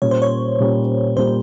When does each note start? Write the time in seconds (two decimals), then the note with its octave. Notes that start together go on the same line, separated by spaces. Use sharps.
0.02 A#2 G3 A#3 C#4 C#5
0.11 C5
0.22 C#5
0.59 A#2 G3 A#3 C#4
1.16 A#2 G3 A#3 C#4 C5